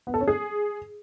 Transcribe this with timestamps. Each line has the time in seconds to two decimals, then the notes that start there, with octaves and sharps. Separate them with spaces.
0.07 B3
0.14 A4
0.21 C#4
0.28 G#4